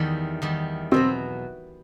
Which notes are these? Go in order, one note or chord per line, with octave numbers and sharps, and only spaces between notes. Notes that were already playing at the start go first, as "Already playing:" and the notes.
Already playing: E2 D#3 G3
E2 D#3 G3
E2 B2 F#3 C4